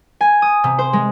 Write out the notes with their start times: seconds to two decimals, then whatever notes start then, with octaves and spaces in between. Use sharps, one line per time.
0.21 G#5
0.42 D#6
0.64 C3
0.79 C5
0.93 G#3